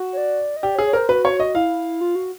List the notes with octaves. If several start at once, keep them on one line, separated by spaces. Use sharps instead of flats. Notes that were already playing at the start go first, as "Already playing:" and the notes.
Already playing: F#4
C#5
D5
D#5
G4 D5
C#5
G#4
C#5
A#4 C5
F#4 B4
C#5
D#5
E4 F5
F4
F#4